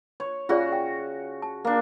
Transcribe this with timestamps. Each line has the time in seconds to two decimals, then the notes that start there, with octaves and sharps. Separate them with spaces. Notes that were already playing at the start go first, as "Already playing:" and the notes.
0.20 C#5
0.49 C#3 F4 F#4 G#4 D5
0.72 G5
1.42 A5
1.65 A#3 D4